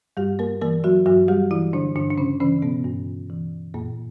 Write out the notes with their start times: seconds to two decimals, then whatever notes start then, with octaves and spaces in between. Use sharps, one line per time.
0.17 G2 G3 G4
0.39 A#3 A#4
0.62 E3 A#3 A#4
0.84 F#3 F#4
1.06 G2 F#3 F#4
1.28 G3 G4
1.51 E3 E4
1.73 D3 D4
1.96 G2 D3 D4
2.11 D4
2.18 C#3 C#4
2.40 C#3 E3 C#4
2.62 B2 B3
2.85 G2
3.30 E3
3.74 F#2 A#2 A#3